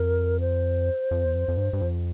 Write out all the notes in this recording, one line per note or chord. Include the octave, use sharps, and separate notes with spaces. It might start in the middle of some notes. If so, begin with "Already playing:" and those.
Already playing: F2 A#4
C5
F2
E2
F2
F2
G2
G2
F2